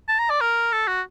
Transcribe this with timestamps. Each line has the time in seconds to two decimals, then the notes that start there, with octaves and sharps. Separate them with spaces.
0.09 A5
0.19 A#5
0.30 D5
0.41 A#4
0.73 A4
0.88 F#4